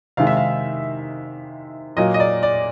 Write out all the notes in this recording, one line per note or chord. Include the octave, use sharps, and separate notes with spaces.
C3 D#3 G#3 F5
E5
F5
A#2 F#3 A#3 D#5
D#5
D5
D5